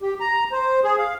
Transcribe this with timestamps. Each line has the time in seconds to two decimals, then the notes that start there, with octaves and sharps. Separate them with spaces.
0.02 G4
0.20 A#5
0.52 C5
0.84 G#4
0.98 F5